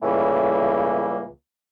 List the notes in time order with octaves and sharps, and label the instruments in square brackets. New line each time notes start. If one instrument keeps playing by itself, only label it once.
[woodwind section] C#2 A2 C#3 E3 G3 A#3